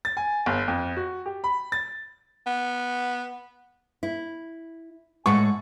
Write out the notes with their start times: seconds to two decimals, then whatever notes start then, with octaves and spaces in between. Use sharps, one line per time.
0.05 A6
0.17 G#5
0.46 G1
0.68 F2
0.97 F#4
1.26 G4
1.44 B5
1.72 A6
2.47 B3
4.03 E4
5.26 A2 G#3 F#5 C#6